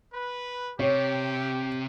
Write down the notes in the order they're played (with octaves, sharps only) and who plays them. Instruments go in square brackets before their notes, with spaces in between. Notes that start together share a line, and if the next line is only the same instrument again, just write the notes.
[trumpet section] B4
[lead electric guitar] C3 [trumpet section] G4 [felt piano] C#5